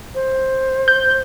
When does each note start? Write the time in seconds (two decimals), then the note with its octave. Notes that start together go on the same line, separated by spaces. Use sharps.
0.14 C5
0.88 G6